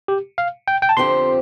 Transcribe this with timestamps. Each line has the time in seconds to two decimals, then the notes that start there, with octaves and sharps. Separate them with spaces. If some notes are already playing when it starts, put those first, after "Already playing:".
0.08 G4
0.38 F5
0.68 G5
0.82 G5
0.89 A5
0.97 F2 D3 F3 C4 G4 C6